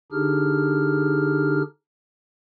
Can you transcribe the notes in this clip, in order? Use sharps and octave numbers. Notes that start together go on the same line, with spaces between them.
D3 D4 D#4 G4 G#4 F6